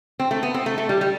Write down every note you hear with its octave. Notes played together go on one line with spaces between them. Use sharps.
C4
A3
B3
C4
A3
A3
G3
G3